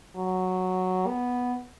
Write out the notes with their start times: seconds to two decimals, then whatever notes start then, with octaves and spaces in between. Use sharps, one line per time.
0.16 F#3
1.07 B3